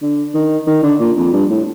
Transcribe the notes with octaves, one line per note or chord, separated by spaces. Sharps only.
D3
D#3
D#3
D3
A#2
F2
G2
A2